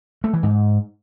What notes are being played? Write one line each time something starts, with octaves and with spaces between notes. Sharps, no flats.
A3
E3
G#2